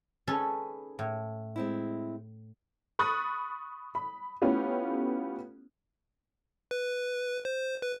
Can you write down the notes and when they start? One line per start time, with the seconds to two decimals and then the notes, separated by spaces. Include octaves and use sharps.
0.27 C#4 D#4 G#4 A4 B4
0.99 A2
1.56 G#3 C4 E4
2.99 B5 C#6 D#6 F#6 A6
3.95 B5
4.42 A3 B3 C#4 E4 F4 G4
6.71 B4
7.45 C5
7.82 B4